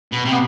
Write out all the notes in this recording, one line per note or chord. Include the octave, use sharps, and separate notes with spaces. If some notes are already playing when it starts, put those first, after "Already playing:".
B2
C3
B3